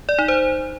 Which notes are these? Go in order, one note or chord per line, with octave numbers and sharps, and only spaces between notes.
D5
D#4
C5